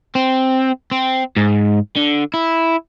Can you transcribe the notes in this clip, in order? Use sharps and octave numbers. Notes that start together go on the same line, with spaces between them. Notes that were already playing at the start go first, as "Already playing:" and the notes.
C4
C4
G#2
D3
E4